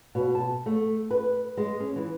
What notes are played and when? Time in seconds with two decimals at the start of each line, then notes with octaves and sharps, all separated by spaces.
0.15 B2
0.35 A5
0.66 A3
1.11 B4
1.57 G#3
1.80 C#4
1.96 E3